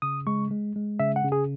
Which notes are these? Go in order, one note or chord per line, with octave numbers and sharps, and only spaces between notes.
C#3 D#6
G#3 C#6
G#3
G#3
C#3 E5
F#5
C#3
G#4